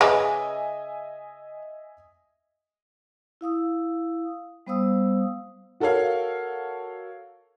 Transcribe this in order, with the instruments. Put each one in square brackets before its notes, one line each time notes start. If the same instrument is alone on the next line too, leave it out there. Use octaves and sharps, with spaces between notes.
[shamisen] C#3 [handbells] G#4 B4 D6 [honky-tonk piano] D#5 E5 G#5
[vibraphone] E4 F5 D#6 E6
G3 B3 C5 F5 D#6 E6
[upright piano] F#4 A4 A#4 C#5 F5